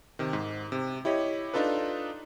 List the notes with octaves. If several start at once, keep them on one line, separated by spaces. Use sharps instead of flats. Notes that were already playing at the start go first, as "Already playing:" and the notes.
C3 D#3
G#2
C3
E4 G4 C#5 D#5
D4 D#4 F4 A4 B4